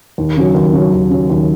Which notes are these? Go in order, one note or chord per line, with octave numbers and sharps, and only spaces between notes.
D#2
C#3 F#3
D#2
C#3 F#3
D#2
C#3 F#3
D#2